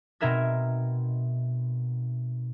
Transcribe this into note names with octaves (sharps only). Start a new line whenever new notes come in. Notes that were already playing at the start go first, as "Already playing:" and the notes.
B2 C4 D#4 A#4 E5 G#6